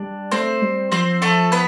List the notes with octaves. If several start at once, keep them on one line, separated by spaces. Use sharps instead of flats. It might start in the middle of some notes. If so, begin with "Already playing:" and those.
Already playing: G3 D4
A3 C4 C5
G3
F3 C4 C5
F3 A3 A4
B3 B4